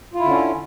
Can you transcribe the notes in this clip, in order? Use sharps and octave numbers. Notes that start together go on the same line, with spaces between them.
D3 C#4 E4 F4